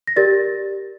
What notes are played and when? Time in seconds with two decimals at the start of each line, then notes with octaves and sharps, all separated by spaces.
0.07 A#6
0.16 G4 A#4 D5 A6